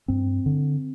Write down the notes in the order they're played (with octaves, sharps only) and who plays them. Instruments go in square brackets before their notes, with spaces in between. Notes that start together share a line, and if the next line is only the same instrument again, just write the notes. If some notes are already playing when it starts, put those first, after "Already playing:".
[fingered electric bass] G2 C4
D3